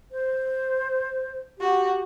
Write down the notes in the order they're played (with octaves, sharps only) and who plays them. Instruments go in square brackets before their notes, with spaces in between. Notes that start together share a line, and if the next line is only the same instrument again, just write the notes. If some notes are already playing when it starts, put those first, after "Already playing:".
[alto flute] C5
[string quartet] F#4 [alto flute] G4